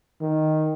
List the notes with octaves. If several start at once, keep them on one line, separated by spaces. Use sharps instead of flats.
D#3